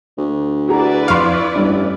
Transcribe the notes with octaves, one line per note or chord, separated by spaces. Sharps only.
D2
E4 F#4 G#4 B4 D5 A#5
F2 F5 C6 C#6 F6
A1 G2 D4